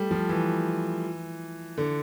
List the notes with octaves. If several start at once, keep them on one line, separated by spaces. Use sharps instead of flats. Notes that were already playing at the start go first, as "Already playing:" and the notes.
Already playing: G3 A3
F3
E3
D3